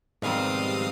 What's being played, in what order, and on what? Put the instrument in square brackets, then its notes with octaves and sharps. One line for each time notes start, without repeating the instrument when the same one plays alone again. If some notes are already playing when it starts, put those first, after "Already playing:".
[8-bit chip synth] G#2 F5 D#6 [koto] B2 D#3 F3 [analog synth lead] G3 [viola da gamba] C4